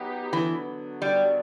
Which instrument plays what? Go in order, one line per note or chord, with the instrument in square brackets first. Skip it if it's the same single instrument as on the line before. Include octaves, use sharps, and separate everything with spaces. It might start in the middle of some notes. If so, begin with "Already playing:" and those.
Already playing: [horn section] F#3 B3 D#4 G4
[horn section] D3 F#3 B3 [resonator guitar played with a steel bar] E3
[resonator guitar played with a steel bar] G3